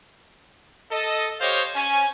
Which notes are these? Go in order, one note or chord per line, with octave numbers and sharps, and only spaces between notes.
A4 D#5
G4 C5 C#5 D#5 F5
C#4 G#5